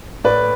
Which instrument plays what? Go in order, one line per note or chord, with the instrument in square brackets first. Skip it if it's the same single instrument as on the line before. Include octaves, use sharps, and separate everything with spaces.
[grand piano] A2 B4 D5